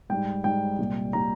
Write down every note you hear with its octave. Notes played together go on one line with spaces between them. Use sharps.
G#2 G3 G5
G#2 G3 G5
C2 A#2 G3
A#2 G3 A#5